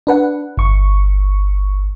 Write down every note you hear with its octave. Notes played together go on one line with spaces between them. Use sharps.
D4 B4 F#5
G1 C#6